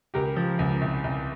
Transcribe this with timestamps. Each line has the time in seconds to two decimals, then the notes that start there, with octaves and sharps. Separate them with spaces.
0.14 C#2 G4 A#4
0.36 F3
0.59 C#2
0.81 C2
1.04 C2